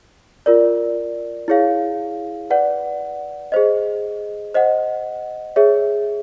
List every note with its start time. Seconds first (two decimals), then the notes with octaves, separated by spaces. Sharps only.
0.46 F4 A#4 D5
1.48 E4 G#4 C#5 F5
2.50 B4 D5 F#5
3.52 G#4 C5 D#5
4.54 C5 D#5 F#5
5.56 G#4 C#5 E5